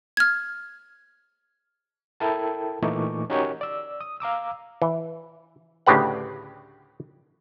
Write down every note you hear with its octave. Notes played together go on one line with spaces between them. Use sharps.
F6 G#6
E4 A4 A#4 G5 A5
A#2 E3 A3 D#4 C#6 D6
C#4 D#4 F#4 G4 A#4 C#5
D5 E6
D#6
F5 A#5 D6 E6
E3
D2 A2 C#3 G4 B4 F#5